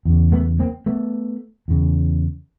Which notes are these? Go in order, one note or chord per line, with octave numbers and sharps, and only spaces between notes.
E2 C#3
A3 B3
A#3 C4
A3 B3
E2 C#3